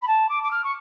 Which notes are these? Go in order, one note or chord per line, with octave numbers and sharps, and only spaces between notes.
B5
A5
D6
D6
F6
C#6